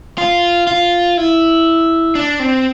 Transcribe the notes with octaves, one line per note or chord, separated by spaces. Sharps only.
F4
F4
E4
D4
C4